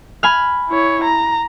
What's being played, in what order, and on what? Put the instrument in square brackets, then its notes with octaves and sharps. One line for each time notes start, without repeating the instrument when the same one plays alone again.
[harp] G#5 B5 F6
[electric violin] E4 C#5
A#5